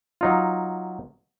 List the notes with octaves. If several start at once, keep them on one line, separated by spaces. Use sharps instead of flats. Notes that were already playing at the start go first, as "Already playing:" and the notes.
F#3 D#4 F4